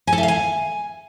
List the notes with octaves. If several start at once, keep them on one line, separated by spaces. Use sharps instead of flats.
G#5
A4
E5
F5
G#5